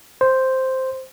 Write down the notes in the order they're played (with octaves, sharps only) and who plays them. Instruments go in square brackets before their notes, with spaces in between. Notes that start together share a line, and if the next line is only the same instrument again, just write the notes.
[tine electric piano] C5